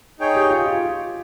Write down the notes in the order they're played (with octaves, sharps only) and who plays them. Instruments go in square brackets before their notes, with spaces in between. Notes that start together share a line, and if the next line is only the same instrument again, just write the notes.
[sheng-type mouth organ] D#4 G#4 C#5 G5
[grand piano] G4
F4
F4